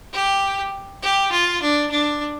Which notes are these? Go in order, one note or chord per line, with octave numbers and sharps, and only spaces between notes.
G4
G4
F4
D4
D4